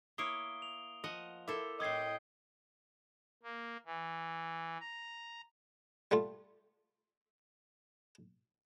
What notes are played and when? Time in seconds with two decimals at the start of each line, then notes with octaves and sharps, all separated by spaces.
0.18 A#3 E4 C#5 D#6 C7 D7 G7
0.62 F7
1.04 F3 D#5 F#5
1.48 E4 A4 A#4 C5 E5 D6
1.80 A2 C4 D#5 G5 D#6 G#6 C7
3.43 A#3
3.86 E3
4.80 A#5
6.11 G3 A3 F4